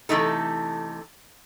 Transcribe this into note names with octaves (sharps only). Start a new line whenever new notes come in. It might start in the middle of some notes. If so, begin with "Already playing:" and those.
C3 E3 A3 D#4 A4